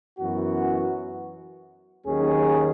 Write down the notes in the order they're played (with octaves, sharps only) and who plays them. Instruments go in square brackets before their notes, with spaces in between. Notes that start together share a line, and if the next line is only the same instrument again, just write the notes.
[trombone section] F#2 E3 B3 F#4
D#2 D#3 F#3 C#4 G#4